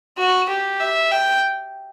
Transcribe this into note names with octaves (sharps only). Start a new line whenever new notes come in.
F#4
G4
E5
G5